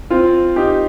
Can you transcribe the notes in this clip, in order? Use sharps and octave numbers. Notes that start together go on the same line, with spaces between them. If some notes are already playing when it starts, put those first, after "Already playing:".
C4 F4
D#4 G4